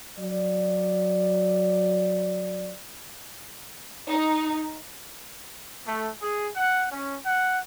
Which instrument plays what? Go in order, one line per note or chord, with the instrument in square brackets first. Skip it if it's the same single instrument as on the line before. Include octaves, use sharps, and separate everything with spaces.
[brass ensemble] F#3 D5
[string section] D#4
[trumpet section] A3
G#4
F#5
C#4
F#5